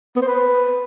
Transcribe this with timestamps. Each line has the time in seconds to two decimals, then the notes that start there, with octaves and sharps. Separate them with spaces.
0.16 B3
0.22 C5
0.28 B4